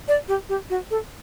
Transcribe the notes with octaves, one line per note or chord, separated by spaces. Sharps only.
D5
G4
G4
F#4
A4